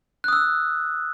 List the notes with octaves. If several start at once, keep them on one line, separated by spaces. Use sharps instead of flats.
D#6 E6 F#6